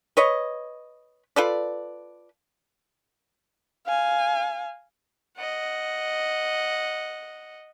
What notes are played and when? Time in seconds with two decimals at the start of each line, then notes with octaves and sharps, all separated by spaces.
0.17 B4 C#5 D#5
1.36 F4 A4 B4 D5
3.86 F5 G#5
5.37 D#5 F#5